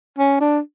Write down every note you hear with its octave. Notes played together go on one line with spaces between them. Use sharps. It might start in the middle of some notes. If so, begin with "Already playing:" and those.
C#4
D4